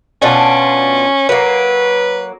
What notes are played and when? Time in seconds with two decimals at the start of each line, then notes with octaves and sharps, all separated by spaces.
0.22 B2 C#4 D4 F4
1.29 F#3 A#3 B4